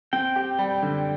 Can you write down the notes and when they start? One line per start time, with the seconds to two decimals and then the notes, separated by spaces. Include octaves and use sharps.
0.13 C4 G5
0.36 G4
0.59 G3
0.82 D3